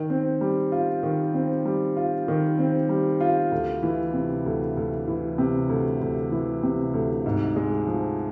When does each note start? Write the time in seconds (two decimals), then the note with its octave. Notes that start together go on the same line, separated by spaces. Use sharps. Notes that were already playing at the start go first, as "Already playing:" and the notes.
Already playing: D#3
0.10 C4
0.41 G3
0.72 F4
1.03 D#3
1.34 C4
1.65 G3
1.97 F4
2.28 D#3
2.59 C4
2.89 G3
3.20 F4
3.52 D2
3.83 E3
4.14 C3
4.46 D2
4.77 D2
5.07 E3
5.38 C3
5.69 D2
6.01 D2
6.31 E3
6.63 C3
6.93 D2
7.26 G#2
7.56 G#3
7.87 F3